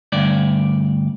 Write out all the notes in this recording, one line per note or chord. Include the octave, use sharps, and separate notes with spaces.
D2 G2 D5